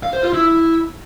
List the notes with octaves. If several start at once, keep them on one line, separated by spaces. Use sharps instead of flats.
F5
C5
F4
E4